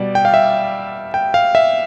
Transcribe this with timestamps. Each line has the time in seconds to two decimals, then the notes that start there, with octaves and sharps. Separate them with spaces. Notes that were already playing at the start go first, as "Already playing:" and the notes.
Already playing: B2 G3 D5
0.15 G5
0.25 F5
0.34 E5
1.14 G5
1.34 F5
1.55 E5